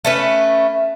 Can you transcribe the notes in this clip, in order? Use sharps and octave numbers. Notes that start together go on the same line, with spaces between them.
A3 C#4 B4